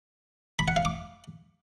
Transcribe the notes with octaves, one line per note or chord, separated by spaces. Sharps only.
B5
F#5
F5
D6